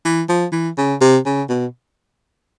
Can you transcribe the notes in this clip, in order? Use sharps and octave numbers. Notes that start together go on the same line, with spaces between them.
E3
F3
E3
C#3
C3
C#3
B2